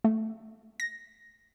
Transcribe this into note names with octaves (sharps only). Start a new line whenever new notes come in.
A3
A#6